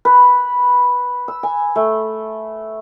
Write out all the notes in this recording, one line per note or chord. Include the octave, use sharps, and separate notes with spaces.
B4
E6
G#5
A3